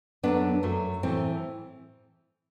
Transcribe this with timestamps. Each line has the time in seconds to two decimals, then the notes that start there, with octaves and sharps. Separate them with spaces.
0.23 F#2 F#3 A3 B3 D4
0.63 F#2 F#3 A3
1.03 A2 E3 A3 C4